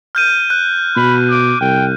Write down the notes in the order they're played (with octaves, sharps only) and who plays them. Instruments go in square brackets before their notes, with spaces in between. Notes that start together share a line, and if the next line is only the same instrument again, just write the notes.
[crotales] F6 G6 D#7
F#6
[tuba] B2 [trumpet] B5
[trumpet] D6
[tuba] C2 [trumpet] G5